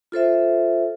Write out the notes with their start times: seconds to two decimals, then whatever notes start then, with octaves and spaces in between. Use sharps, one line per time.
0.12 F4 A4 C5 E5